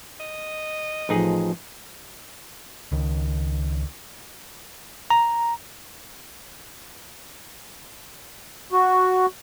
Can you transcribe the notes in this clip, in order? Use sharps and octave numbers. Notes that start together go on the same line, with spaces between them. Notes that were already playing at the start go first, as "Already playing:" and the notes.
D#5
A1 F3 D#4 G#4
C#2 D#3
A#5
F#4